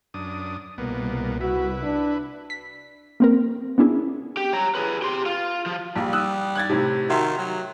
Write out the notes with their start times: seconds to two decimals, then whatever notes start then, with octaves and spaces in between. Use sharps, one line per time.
0.14 F#2 D4 D#6
0.78 C2 B2 A#3 B3
1.41 E4 F#4 B4
1.83 D4
2.50 B6
3.20 A#3 C4 A#4
3.78 B3 C#4 D4 E4 G#4
4.37 G4
4.53 C#5 A#5
4.75 G#4 B4
5.02 G4 C6
5.26 F4
5.66 F3
5.96 A#1 G3
6.13 D#6 E6 F#6
6.55 F#6 G#6 A6
6.70 A2 C3
7.09 D#3 F#4 E5 C6
7.38 F#3